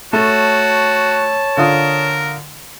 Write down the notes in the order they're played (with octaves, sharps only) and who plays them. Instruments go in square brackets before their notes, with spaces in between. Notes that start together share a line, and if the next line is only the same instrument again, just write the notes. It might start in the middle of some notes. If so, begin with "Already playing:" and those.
[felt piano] A3 [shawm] F#4 [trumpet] C#5 [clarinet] A5
[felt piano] D3 F4 D#6 [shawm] A#4